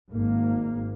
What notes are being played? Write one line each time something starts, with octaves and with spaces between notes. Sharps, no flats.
G#1 G#2 A#3